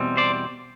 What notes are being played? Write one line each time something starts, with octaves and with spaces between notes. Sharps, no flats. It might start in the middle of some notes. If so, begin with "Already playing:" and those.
Already playing: E2 B2 G3 C4
C5 D5